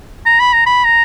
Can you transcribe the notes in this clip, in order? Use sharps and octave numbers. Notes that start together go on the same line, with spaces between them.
A#5
B5
A#5
B5
A#5